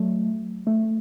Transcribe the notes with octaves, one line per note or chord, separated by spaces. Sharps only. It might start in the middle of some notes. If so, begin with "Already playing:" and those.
Already playing: F#3 A3
A3